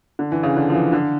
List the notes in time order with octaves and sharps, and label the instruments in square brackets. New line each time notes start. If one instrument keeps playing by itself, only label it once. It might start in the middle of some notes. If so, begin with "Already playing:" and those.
[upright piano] D3
E3
C#3
D3
F3
E3
D3